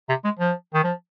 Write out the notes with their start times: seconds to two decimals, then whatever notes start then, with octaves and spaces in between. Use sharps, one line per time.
0.09 C3
0.24 G#3
0.39 F3
0.74 D#3
0.84 F3